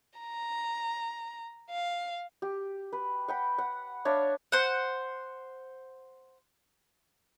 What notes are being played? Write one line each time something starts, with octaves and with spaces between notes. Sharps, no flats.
A#5
F5
G4
B4
F#5 G5 B5
F#5
D4 C#5 E5 F5
C5 F#5